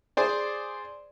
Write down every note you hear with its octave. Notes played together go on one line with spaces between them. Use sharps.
G#4 C5 D5